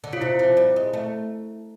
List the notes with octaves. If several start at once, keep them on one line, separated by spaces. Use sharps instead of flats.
D3
C#3 F4
C3 E4
F3
G3
G#3
A3